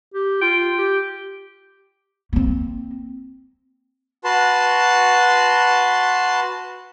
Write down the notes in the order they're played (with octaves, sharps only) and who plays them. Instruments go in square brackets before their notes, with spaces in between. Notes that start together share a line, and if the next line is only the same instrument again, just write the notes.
[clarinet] G4
[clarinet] F4 [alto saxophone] G5
[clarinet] G4
[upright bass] A#3 C4
[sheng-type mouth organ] F#4 B4 A5 C6